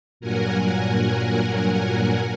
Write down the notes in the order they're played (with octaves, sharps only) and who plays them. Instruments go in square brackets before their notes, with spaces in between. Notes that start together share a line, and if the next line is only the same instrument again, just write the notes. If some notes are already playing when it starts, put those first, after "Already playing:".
[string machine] G2 A#2 F#3 A#4 F#5 G#5